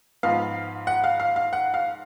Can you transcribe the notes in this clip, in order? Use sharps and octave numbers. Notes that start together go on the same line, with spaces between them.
G#2 F3 B3 F5
F#5
F5
F5
F5
F#5
F5